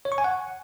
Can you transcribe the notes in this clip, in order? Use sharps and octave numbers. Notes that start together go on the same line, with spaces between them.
C#5
C#6
G#5
F#5